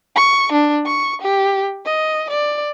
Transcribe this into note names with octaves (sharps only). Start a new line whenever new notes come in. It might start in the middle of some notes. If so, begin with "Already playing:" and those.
C#6
D4
C#6
G4
D#5
D5